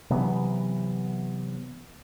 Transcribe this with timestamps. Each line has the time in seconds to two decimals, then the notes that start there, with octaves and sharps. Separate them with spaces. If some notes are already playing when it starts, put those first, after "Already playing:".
0.10 C3 E3 F#3 B3